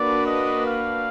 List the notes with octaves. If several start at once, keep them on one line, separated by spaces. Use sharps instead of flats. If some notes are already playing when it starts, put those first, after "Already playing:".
Already playing: A#3 D4 F#4 B4 D5
D#5
F5